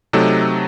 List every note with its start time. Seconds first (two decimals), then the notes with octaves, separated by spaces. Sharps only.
0.13 C3 F#3 A3 D#4 A4